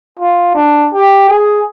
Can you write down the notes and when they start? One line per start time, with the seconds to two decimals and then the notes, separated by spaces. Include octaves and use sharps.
0.19 F4
0.55 D4
0.94 G4
1.29 G#4